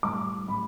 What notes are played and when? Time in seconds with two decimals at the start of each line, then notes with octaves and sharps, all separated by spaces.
0.03 A2 G3 D6
0.48 A2 G3 B5